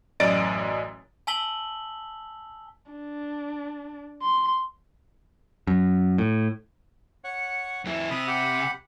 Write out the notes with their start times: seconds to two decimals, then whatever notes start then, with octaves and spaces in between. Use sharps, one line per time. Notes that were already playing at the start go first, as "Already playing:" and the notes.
0.20 A1 F#2 D5 D#5 A6 D7
1.27 G#5 A5 E6 B6 F#7 G7
2.92 D4
4.23 C6
5.67 F#2
6.18 A2
7.24 C#5 F#5
7.85 F2 E4
8.11 C3 B5 D#6
8.27 G4 F#5 B5